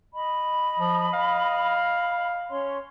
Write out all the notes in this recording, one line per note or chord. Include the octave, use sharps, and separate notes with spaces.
D#5 B5
F3
F5
C#4 C#5 C6